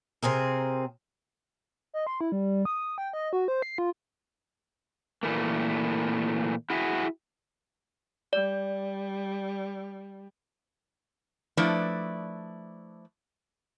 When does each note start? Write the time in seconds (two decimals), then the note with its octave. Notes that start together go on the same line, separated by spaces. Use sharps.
0.23 C3 C4 G#4 A#4
1.94 D#5
2.07 C6
2.21 E4
2.32 G3
2.65 D#6
2.98 G5
3.13 D#5
3.33 F#4
3.48 C5
3.62 C7
3.78 F4
5.23 A#2 E3 A3 A#3
6.70 E4 F#4 G#4 E5
8.33 G3 D5
11.57 F3 A3 D4 E4 B4 D5